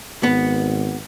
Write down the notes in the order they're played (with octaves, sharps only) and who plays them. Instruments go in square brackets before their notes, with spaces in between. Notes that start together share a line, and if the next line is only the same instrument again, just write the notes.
[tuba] G#1 [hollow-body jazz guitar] B3